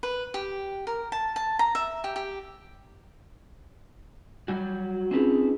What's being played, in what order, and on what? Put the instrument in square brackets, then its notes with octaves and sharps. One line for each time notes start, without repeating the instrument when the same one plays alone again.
[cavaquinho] B4
G4
A#4
A5
A5
A#5
E5
G4
G4
[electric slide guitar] F#3 G3 F#4
[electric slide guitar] C4 D#4 B4 [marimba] C#4 F4 G#4